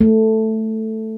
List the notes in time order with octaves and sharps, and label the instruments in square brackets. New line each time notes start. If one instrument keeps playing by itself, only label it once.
[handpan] A3